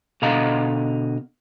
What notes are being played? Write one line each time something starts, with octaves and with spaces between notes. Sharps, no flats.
B2 D3 D#5 F5 A#5